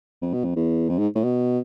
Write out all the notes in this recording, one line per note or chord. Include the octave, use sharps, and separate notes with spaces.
F2
B2
F2
E2
F2
G#2
A2
B2